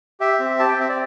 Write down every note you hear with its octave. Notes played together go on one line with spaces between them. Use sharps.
G4 E5
C4
G4 A5
G5
C4 E5
D5